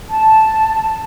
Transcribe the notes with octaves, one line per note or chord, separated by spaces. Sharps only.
A5